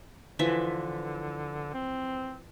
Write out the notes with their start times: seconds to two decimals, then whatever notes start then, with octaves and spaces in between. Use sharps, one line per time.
0.39 D3 E3 F3 E5
1.74 C4